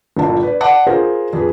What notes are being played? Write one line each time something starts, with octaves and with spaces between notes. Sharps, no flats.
G1 A#2 F3 E4 A5
B4 D5
D5 D#5 F#5 A5 D6
F4 G#4 A#4 C5
F2 G#4 B4